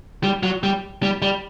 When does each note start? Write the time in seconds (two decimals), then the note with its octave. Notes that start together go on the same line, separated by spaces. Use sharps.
0.23 G3
0.43 F#3
0.63 G3
1.03 G3
1.22 G3